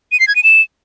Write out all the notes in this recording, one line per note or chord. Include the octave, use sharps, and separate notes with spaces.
D#7
C7
G#6
D#7
E7